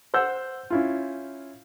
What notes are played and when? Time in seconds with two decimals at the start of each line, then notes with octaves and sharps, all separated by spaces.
0.14 C5 F#5 E6 G6
0.70 C#4 E4 F4